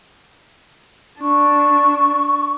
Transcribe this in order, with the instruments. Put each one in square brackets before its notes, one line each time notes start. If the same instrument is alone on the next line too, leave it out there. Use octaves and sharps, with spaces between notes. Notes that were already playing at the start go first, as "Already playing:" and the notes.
[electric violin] D4 [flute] C#6